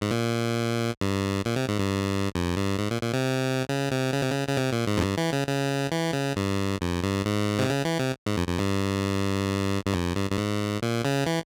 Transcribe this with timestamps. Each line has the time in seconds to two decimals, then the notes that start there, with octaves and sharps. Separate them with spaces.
0.01 G#2
0.11 A#2
1.01 G2
1.45 A#2
1.56 C3
1.68 G#2
1.79 G2
2.35 F2
2.57 G2
2.79 G#2
2.91 A#2
3.02 A#2
3.13 C3
3.69 C#3
3.91 C3
4.13 C#3
4.22 C3
4.31 C#3
4.48 C#3
4.57 C3
4.72 A#2
4.87 G#2
4.98 F2
5.02 G2
5.17 E3
5.33 C#3
5.48 C#3
5.92 E3
6.13 C#3
6.36 G2
6.81 F2
7.03 G2
7.25 G#2
7.59 C3
7.70 C#3
7.85 E3
7.99 C3
8.26 G#2
8.37 F2
8.48 F2
8.59 G2
9.86 G2
9.94 F2
10.16 G2
10.31 G2
10.38 G#2
10.82 A#2
11.05 C#3
11.27 E3